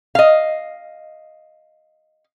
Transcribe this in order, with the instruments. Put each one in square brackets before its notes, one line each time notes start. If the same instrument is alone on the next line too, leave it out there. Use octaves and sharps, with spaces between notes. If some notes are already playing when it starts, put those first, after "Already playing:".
[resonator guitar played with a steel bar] D#5 F5